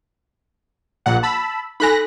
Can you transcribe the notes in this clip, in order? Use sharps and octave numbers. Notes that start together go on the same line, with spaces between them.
A#1 A#2 F#5
A5 B5 E6
D#4 A4 G#5 B5 F#6 A#6